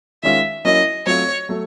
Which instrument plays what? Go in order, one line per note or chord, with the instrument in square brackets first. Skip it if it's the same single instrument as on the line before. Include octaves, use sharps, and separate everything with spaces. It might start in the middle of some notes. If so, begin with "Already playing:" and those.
[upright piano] D#3 G#3 C#4 F4 [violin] E5
[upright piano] F#3 A#3 C#4 E4 [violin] D#5
[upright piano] F#3 A3 C4 F4 [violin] C#5
[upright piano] F#3 A3